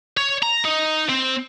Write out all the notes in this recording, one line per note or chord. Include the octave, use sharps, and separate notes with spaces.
C#5
A#5
D#4
C4